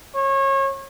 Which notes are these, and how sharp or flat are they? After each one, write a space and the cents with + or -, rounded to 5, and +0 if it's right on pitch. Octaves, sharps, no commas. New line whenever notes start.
C#5 -30